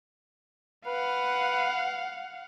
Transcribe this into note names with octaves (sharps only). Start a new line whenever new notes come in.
B4 F5 F#5